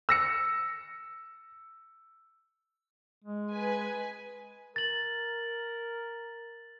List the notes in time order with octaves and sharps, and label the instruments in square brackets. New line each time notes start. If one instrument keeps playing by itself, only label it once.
[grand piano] E6 A#6 C#7
[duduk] G#3
[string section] B4 G#5
[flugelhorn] A#4 [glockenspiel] A6 F#7